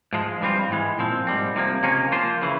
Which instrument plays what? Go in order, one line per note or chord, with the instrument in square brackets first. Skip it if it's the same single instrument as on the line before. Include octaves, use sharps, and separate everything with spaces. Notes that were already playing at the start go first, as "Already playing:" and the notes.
[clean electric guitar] G#2 F3 G#3
G2 E3 G3 C4 F4
G#2 E3 G#3
A#2 F3 C4
G#2 G3 C4
C2 C3 F3 A#3
C#2 C3 F3 A#3 C#4
F3 A#3 F4 C5
C#3 E3